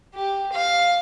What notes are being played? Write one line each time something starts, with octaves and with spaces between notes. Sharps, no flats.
G4
F5